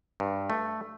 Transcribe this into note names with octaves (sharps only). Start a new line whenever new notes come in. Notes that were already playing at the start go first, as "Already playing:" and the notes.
G2
A3